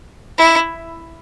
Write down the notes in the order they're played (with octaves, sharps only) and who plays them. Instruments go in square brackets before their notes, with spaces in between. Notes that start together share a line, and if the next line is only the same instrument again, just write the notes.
[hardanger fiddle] E4